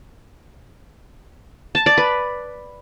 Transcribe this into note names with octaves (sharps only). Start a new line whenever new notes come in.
A5
D5
B4